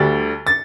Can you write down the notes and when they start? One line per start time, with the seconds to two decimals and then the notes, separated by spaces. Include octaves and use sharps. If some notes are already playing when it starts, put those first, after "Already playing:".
Already playing: D2 D3 G3 A6
0.47 A6